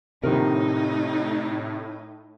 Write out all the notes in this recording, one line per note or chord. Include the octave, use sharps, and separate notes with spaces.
A#1 A2 C3 D#3 D#4 A#4